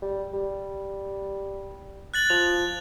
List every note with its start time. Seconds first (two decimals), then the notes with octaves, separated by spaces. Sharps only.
0.02 G3
0.34 G3
2.14 F#6 A6 F#7
2.30 F3 F7